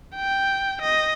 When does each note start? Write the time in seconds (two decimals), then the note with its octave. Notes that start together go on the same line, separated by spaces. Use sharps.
0.16 G5
0.81 D#5